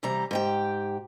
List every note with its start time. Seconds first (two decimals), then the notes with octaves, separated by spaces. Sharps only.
0.03 C3 E3 G3 A#5
0.31 G#2 G4 G5